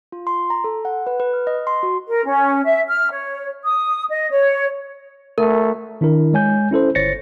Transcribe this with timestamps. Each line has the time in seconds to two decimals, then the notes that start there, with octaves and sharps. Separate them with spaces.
0.12 F4
0.27 C6
0.50 A#5
0.64 A4
0.85 F#5
1.07 B4
1.20 B4
1.33 F6
1.47 D#5
1.67 C6
1.83 F#4
2.07 A#4
2.25 C#4
2.65 E5
2.88 F6
3.11 C#5
3.64 D#6
4.10 D#5
4.30 C#5
5.38 A3 A#4
6.01 D#3 D4 E4 A#4
6.33 G#3 C#5 G#5 G6
6.71 C#4 E4 A4 C5
6.95 G1 C5 C#5 A6 A#6 C#7